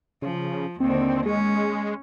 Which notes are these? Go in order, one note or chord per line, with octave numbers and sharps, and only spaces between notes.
C#3 F3
D#2 D3 C4
G#3 C#4